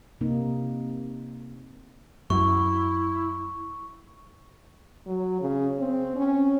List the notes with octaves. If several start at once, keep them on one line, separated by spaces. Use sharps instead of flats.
C3 A#3 D#4
F#2 E4 C#6
F#3
C#3
C4
C#4